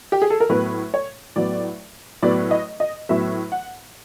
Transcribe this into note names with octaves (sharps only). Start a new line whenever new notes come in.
G4
G#4
A4
A#4
A2 F#3 B3 B4
C#5
A2 F#3 B3 D5
A2 F#3 B3 D5
D#5
D#5
A2 F#3 B3 E5
F#5